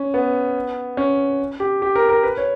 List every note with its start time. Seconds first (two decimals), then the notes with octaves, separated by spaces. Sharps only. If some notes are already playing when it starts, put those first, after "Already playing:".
Already playing: C#4
0.14 B3
0.97 C#4
1.60 G4
1.82 G4
1.96 A#4
2.09 A#4
2.23 B4
2.37 C#5